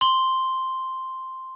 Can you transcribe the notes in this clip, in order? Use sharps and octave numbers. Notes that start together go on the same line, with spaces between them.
C6 G7